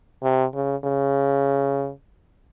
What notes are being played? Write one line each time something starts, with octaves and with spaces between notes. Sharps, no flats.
C3
C#3
C#3